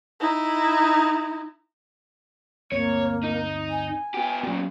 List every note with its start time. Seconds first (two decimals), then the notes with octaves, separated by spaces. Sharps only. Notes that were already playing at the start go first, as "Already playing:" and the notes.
0.20 D#4 E4
2.72 G1 D2 A#3 C4 C#5
3.24 D#4
3.70 G#5
4.14 B3 G4
4.43 A#2 C#3 F#3 B3